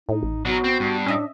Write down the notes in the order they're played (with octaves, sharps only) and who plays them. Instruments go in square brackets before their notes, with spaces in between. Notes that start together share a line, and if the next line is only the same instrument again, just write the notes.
[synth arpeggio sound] A2 [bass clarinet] D#4
[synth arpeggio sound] A1
[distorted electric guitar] F#3 D#4 [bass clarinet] B3 [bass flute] F#4
[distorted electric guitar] C4
G2
[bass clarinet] A2 [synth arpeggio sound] C#4 D#5 E5 [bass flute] D4